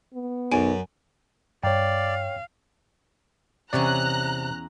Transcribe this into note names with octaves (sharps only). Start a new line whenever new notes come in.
B3
B1 F#2 G#5 D7
G2 C#5 D5 F5 G5
E2 C3 C#4 C#5 D5 A#5 F#6